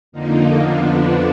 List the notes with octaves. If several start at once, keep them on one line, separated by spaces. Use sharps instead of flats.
F2 D3 F3 A#3 D#4
F2 D3 F3 B3 D4